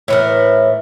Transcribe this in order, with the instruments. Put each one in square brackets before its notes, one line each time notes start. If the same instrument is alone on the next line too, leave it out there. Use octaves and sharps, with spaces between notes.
[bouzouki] A2 E3 A#4